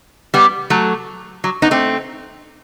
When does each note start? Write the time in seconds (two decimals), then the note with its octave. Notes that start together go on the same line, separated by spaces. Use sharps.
0.34 G3 B3
0.70 F#3 A3
1.44 F#3
1.62 B3 D#4
1.71 A3 C4